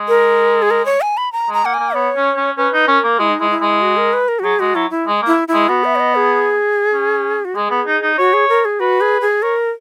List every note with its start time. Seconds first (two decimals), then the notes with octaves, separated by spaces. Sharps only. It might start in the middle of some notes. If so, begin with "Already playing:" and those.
Already playing: G#3
0.08 A#4
0.62 G#4
0.71 A#4
0.86 C#5
1.01 G#5
1.17 B5
1.32 A#5
1.49 G#3 A#5
1.64 A#3 F#5
1.74 G#5
1.79 A#3
1.95 B3 C#5
2.16 C#4
2.37 C#4
2.57 C#4 B4
2.73 D#4
2.88 C#4 A#4
3.04 A#3
3.19 G#3 E4
3.29 D#4
3.40 G#3 E4
3.51 E4
3.61 G#3
3.82 F#4
3.97 A#4
4.13 B4
4.28 A#4
4.39 F#4
4.44 F#3 G#4
4.60 G#3 F#4
4.75 F#3 E4
4.91 E4
5.07 G#3
5.22 A#3 E4
5.48 E4
5.54 G#3
5.69 B3 F#4
5.84 E5
5.96 C#5
6.00 D#5
6.15 G#4
6.93 C#4
7.45 F#4
7.55 G#3 G#4
7.71 B3
7.86 D#4
8.02 D#4
8.18 F#4 C#5
8.33 G#4
8.49 A#4
8.65 G#4
8.80 F#4 B4
9.01 G#4
9.21 G#4
9.42 A#4 C#5